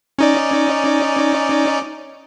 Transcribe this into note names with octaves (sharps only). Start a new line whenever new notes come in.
C#4 D#4 D5